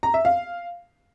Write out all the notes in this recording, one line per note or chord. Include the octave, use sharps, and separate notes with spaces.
A#5
E5
F5